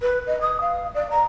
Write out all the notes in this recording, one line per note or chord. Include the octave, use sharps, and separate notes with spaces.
B4
D#5
D#6
F5
D5
A#5